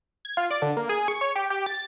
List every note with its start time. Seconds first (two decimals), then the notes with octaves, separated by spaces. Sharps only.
0.25 G#6
0.37 F4
0.51 D5
0.62 D3
0.77 A#3
0.89 G#4
1.08 C#6
1.21 C#5
1.35 G4
1.50 G4
1.66 A6